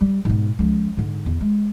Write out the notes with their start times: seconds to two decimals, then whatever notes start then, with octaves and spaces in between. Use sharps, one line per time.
0.01 G3
0.25 G#2 B2
0.59 C#2 F3
0.97 G#2 D3
1.26 E2
1.41 G#3